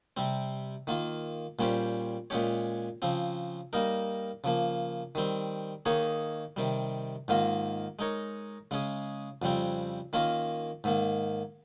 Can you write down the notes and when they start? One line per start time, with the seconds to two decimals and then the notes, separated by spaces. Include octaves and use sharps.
0.17 C3 G3 C4
0.87 D#3 A#3 F4
1.59 A#2 G3 C#4 G4 C5
2.30 A#2 G#3 C#4 G4 C#5
3.02 C#3 F3 C4
3.73 G3 A#3 D#4 A#4
4.44 C#3 F3 A#3
5.15 D#3 G3 C4
5.86 D#3 A#3 D#4 G#4 C#5
6.56 C3 D#3 G3
7.28 G#2 D#3 A#3 F4 A#4
7.99 G#3 D#4 A#4 C#5
8.71 C#3 G#3 C#4 G#4
9.42 F2 C#3 G3 C4
10.13 D#3 A#3 C#4 F4 A#4
10.84 G#2 D#3 A#3